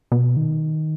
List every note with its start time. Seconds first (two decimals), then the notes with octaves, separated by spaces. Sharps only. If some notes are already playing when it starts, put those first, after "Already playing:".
0.12 B2
0.36 D#3